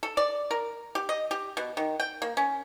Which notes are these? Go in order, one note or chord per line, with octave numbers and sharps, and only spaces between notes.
A4
D5
A#4
G4
D#5
G4
B2
D#3
G5
A#3
C#4